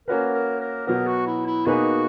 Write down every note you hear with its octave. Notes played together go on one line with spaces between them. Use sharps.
A#3 C#4 F#4 A#4 B4
A#4
A#4
B2 F#3 B3 A#4
F#4
E4
E4
B2 A#3 D#4 F#4 G#4 B4